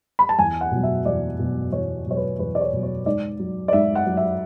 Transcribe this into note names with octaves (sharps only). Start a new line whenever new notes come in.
B5
A5
E2 G#5
F#5
B2 F#3
E5
E2 D5
B2 F#3
E2 C#5
B2 F#3 C#5
B4
E2 B4
D5
C#5
B2 F#3
C#5
G#2 D5
F#3
D5
G#2 E5
F#5
F#3
E5